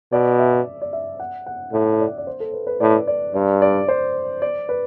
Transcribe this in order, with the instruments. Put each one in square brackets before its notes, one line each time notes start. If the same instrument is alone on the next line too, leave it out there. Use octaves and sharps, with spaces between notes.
[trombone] B2 [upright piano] D5
[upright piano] E5
D5
E5
F#5
F#5
[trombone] A2 [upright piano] E5
[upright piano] E5
D5
D5
C5
A4
B4
B4
[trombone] A2 [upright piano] D5
[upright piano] D5
[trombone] G2 [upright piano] D5
[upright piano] D5
C5
D5
B4